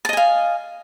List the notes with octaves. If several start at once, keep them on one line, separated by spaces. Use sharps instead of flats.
D#5 F5 G#5 A5